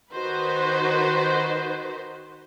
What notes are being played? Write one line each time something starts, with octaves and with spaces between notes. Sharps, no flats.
D#3 D#4 F#4 B4 C5